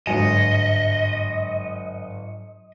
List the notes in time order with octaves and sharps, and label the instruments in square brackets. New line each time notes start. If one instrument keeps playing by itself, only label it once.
[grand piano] G1 G#5 [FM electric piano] G#2 F#3 C#7 [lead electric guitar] D#5